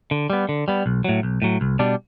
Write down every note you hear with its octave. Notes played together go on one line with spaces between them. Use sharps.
D3
G3 B3
D3
G3 B3
B1
A2 F#3
B1
A2 F#3
C2
B2 G3 D4